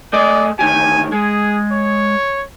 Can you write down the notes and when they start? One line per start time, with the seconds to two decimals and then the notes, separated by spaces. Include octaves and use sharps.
0.13 A3 G#4 D5 D#5
0.59 D2 D#3 G4 G#5
1.12 G#3 G#4
1.71 C#5